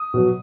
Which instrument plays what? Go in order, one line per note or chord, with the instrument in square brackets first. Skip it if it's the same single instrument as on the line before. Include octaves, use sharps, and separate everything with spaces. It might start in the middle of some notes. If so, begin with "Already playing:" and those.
Already playing: [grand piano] D#6
B2 F#3